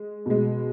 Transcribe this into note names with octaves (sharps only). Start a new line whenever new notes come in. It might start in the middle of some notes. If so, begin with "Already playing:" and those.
Already playing: G#3
B2 G#3